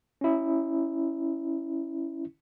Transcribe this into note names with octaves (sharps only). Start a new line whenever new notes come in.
C#4 E4